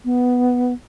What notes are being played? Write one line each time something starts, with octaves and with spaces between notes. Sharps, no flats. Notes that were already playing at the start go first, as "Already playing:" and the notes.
B3